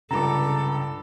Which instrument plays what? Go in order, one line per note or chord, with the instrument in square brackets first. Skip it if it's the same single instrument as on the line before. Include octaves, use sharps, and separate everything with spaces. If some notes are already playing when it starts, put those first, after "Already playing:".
[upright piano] C#2 G2 [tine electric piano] C#3 D4 [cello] A4 [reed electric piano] A#5 D6